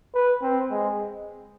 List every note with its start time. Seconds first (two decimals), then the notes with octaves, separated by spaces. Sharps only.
0.14 B4
0.42 C4
0.71 G#3